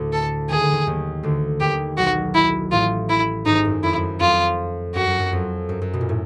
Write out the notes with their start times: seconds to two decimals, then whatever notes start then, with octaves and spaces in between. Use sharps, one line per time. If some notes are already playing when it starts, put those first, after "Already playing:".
Already playing: D2 A2 D3
0.13 A4
0.49 D#3 G#4
0.61 D3
0.72 D#2 D#3
0.87 D#2 D#3
1.23 D2 D3
1.61 D#2 D#3 G4
1.98 B1 B2 F#4
2.35 E4
2.72 A1 A2 F4
3.10 E4
3.46 G#1 G#2 D#4
3.65 F#2
3.83 F2 E4
3.96 F#2
4.21 F2 F4
4.95 F#2 F#4
5.07 F#2
5.20 F#2
5.32 F2
5.69 F#2
5.82 F#2
5.94 B2
6.01 A#2
6.09 A2